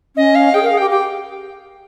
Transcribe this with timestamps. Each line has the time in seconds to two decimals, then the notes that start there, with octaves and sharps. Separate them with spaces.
0.16 C#4 D#5
0.35 F5
0.54 G#4 G5
0.63 A#4
0.66 F5
0.72 G#4
0.78 G4 G5
0.90 G4 G5